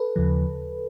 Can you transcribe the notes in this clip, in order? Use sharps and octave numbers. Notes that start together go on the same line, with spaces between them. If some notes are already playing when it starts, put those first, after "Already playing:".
Already playing: A4 B4
D#2 C#3 F3